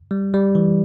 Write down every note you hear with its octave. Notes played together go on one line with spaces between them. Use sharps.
G3
G3
E3